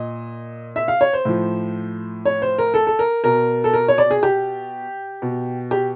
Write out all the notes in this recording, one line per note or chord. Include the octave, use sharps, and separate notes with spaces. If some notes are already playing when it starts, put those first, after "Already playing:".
Already playing: A#2 D#5
E5
F5
C#5
C5
A2 F3
C#5
C5
A#4
A4
A4
A#4
B2 A#4
A4
A#4
C#5
D5
G#4
G4
B2
G4